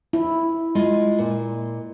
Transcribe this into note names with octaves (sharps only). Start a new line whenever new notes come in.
E4
G#3 F4 D#5
A#2